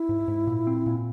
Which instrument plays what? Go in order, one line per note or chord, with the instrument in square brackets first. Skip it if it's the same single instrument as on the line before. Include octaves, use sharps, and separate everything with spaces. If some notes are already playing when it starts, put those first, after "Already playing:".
Already playing: [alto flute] E4
[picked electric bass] G#2
G#2
A#2
C4
A#2